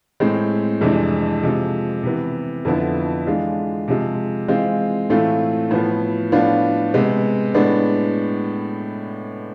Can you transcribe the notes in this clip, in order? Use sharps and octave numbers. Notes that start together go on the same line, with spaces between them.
A2 G#3 C4
F2 C3 E3 G#3 D4
C3 F3 G#3
C3 E3 B3
F2 D3 F3 B3 E4
E3 G#3 D4 F4
C3 F3 G#3
E3 G#3 C4 F4
A2 E3 A3 C4 F4
A2 F3 B3
A2 F3 B3 D4 F4
C3 G#3 B3
A2 G#3 B3 D4